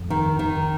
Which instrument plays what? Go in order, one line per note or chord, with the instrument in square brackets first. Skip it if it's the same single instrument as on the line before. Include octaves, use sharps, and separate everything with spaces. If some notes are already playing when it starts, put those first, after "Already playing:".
Already playing: [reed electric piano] F2
[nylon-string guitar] D#3
D#3